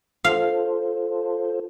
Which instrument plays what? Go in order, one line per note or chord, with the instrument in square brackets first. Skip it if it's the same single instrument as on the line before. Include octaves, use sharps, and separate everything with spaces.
[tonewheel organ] F4 A4 C5 [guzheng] F5